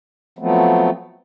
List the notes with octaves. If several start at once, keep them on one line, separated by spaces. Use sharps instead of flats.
F3 F#3 A3 B3 C4